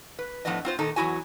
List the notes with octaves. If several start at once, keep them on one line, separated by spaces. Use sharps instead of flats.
B4
A2 F3 B3 D4 B4 D#5
C4 F4 C5
A#2 D#3 D#4 A4
E2 F#3 E4 F#4 G#5